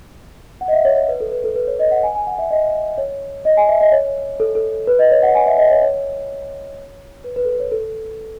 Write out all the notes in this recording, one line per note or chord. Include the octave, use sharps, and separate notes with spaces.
F#5
D#5
E5
C#5
C#5
B4
A4
B4
A4
B4
C#5
D#5
F#5
G#5
G#5
F#5
E5
D#5
C#5
D#5
G#5
E5
D#5
C#5
A4
A4
B4
D#5
C#5
F#5
G#5
E5
D#5
C#5
C#5
B4
B4
A4
B4
C#5
A4